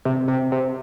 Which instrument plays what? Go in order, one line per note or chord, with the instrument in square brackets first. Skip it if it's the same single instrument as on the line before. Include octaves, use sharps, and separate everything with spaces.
[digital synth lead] C3
C3
C3